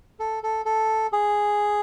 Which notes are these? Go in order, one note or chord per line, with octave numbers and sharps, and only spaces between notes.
A4
A4
A4
G#4